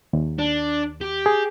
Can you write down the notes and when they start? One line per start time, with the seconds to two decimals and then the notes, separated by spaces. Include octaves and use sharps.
0.13 D#2
0.39 D4
1.01 G4
1.26 G#4